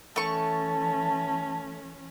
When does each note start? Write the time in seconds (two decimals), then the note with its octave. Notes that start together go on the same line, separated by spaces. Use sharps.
0.16 E3 A3 C#4 A5 C#6